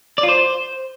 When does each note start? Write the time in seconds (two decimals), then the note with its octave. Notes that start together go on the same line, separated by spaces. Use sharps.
0.18 D5
0.23 F4
0.28 C5